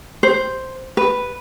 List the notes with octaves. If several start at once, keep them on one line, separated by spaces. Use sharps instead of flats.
C5
B4